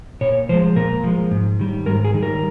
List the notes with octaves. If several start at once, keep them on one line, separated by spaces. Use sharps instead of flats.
A#2 C#5
F3 G#3 C5
A#2 A#4
F3 G#3
G#2
D#3 G3
G#2 A#4
G#4
D#3 G3
A#4